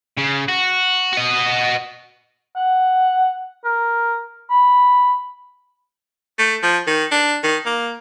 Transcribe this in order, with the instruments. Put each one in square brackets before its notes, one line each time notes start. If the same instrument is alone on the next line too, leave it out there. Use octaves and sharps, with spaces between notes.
[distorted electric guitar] C#3
F#4
F#4 D#5
[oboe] F#5
A#4
B5
[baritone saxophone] A3
F3
D#3
D4
D#3
A#3